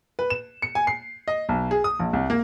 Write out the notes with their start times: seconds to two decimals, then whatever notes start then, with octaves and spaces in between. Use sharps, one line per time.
0.19 B4
0.30 E7
0.62 C#7
0.75 G#5
0.87 C7
1.28 D#5
1.49 B1
1.71 G#4
1.84 D#6
1.99 A#1
2.13 C2
2.30 A#3